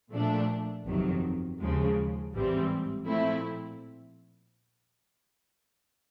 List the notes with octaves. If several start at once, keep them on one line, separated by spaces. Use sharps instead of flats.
A#2 F3 A3 D4
G1 F2 C3 D#3 F#3
D#2 C#3 F3 G#3
A1 G#2 E3 G3 C4
A#2 F3 A3 C4 E4